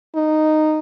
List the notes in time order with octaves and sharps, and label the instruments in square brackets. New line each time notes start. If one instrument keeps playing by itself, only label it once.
[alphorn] D#4